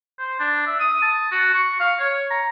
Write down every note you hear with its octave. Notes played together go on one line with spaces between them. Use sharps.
C5
D4
E5
D#6
A5
F#4
C#6
F5
C#5
A#5